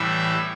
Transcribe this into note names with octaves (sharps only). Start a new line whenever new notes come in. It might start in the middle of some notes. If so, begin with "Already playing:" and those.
Already playing: A2 E3 G3 E5